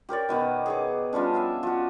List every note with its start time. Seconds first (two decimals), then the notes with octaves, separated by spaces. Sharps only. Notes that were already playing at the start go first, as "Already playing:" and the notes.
0.09 G4 A#4 C#5 D5
0.29 B2 D#3 B3
0.66 G#4 C#5 D6
1.13 F3 G3 C#4 D4
1.34 E5 F5 G#5
1.63 F3 F#4